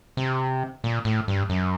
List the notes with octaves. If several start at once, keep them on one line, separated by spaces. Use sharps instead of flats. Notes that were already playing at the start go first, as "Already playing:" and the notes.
C3
A#2
A2
G2
F#2